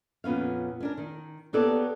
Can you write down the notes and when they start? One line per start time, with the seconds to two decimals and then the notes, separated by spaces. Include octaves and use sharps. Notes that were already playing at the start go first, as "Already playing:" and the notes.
0.24 F2 A#2 B3 C#4 F5
0.80 C#4 D4 A#4
0.98 D#3
1.53 A#3 B3 G4 A4 C#5 D5